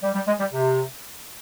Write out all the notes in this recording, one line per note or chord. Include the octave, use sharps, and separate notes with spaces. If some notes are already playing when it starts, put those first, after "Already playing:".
G3
G3
G#3
G3
C3